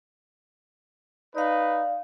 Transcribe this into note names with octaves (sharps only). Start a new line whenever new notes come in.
D#4 B4 D5 F5